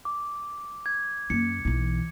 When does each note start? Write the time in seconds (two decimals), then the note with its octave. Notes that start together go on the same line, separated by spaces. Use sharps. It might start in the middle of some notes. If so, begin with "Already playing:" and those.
0.05 D6
0.86 G#6
1.30 F#2 A#3 C#7
1.65 B1 E3